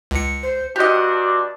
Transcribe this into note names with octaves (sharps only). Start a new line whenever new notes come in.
C#2 C#7
C5
G2 D4 F#4 G4 D#5